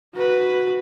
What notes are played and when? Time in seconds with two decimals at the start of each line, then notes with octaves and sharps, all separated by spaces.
0.15 F#4 B4